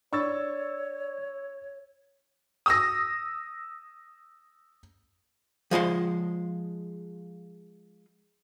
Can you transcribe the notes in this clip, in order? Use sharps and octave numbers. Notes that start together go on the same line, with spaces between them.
D4 C#5 D5 C#6 E6 A6
D#6 E6 A#6
F3 G#3 G#5 C6